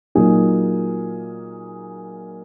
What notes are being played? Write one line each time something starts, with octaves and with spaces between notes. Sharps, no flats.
A#2 F#3 A#3 D#4 G#4